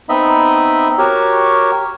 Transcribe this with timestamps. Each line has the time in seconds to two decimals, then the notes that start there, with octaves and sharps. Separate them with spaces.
0.09 B3 C4 D#4 D#5 E5 B5
0.98 F#4 G4 A#4 C#5